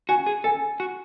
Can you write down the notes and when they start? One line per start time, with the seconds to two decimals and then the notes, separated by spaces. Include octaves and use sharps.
0.09 F#4 G#5
0.26 G#4
0.44 A4 G#5
0.80 F#4